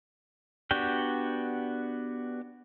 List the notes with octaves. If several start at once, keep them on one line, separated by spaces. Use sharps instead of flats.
B3 D4 F#4 G4 G5